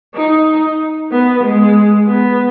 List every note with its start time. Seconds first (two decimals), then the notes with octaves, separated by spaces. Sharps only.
0.15 D#4
1.12 B3
1.44 G#3
2.08 B3